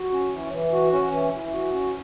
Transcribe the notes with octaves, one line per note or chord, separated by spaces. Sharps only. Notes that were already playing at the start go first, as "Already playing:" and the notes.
Already playing: F#4
C#4
E3
E3
F#4
C#4
E3
E3
F#4
C#4